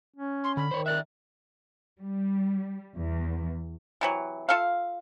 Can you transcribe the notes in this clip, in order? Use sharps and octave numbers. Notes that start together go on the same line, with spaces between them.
C#4
C6
D3 B5
D#3 C5 C#5
A#4 D5 E5 F#6
G3
E2
C3 E3 F#3
F4 A4 E5 F5